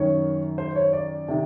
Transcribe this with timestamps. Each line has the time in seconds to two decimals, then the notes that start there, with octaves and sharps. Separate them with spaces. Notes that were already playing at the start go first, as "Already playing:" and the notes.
Already playing: F#2 D#3 C#5
0.58 C5
0.76 C#5
0.93 D5
1.28 C3 D#3